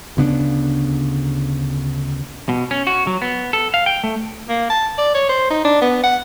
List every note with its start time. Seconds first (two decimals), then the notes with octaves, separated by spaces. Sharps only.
0.17 D2 C#3 B3 D4
2.49 B2
2.71 C#4
2.87 F#4
3.07 F#3
3.22 B3
3.53 A4
3.74 F5
3.86 G5
4.04 A3
4.49 A#3
4.70 A5
4.98 D5
5.14 C#5
5.29 C5
5.50 D#4
5.65 D4
5.82 B3
6.03 F#5